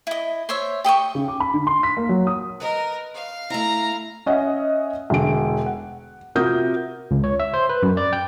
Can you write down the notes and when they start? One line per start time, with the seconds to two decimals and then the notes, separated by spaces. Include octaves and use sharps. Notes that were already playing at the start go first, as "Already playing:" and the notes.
0.07 E4 D#5
0.49 C5 C#5 E5
0.84 G4 D#5 G5 C#6
1.15 C#3
1.28 D6
1.40 B5
1.54 D3
1.67 C6
1.83 B6
1.97 A#3
2.09 F#3
2.27 D#6
2.60 A#4 B4 D#5
3.14 F5
3.50 A3 E4 A#5
4.26 C#4 D#5 E5 F#5
5.10 E1 D3 D7
5.66 F#5
6.35 C3 F4 F#4 A#4 D#6 G6
7.11 C#2
7.24 C#5
7.40 E5
7.54 C5
7.69 B4
7.83 F#2
7.97 D5
8.13 G5